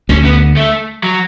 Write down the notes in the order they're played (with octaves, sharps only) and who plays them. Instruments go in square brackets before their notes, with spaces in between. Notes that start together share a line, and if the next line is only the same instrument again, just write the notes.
[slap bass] D2 D3 [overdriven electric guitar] C#4
[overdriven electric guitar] B3
A3
F#3